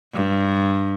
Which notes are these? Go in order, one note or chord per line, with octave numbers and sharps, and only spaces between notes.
G2